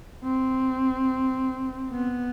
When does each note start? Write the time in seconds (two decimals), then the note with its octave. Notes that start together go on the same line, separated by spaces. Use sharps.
0.24 C4
1.93 B3